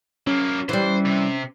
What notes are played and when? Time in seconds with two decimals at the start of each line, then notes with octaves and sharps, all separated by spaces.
0.27 F#3 A#3 C#4
0.69 E3 G3 C5
1.05 C3